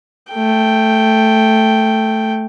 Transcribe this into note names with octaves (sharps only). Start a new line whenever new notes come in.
A3 G5